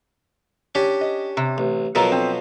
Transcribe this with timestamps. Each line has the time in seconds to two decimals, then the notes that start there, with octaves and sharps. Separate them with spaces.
0.75 C#4 D4 G4
1.01 D#5
1.37 C3
1.58 A1
1.95 B2 F3 F#3 A4 A#4
2.12 C4